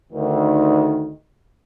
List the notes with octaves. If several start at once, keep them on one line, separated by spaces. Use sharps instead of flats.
D2 D#3